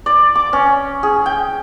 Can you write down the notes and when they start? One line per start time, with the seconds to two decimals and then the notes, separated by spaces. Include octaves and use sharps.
0.06 D5
0.35 D6
0.53 C#4
1.03 G#4
1.26 G5